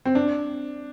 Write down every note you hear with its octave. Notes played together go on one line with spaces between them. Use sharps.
C4
D4